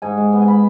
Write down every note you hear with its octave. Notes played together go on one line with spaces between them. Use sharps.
G#2 G#5
G#3
B3
G#5
B5